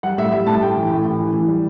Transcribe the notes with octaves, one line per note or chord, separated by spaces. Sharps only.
G3 F#5
A2 E5
G3 E5
A2 A5
A2 G5
E3
A2
A2
E3
E3
G3